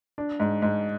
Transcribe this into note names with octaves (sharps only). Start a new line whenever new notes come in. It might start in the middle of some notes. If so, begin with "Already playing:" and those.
D4
G#2
G#2